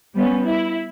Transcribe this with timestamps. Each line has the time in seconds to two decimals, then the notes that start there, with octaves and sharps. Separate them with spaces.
0.15 G3 B3 C#4
0.45 E4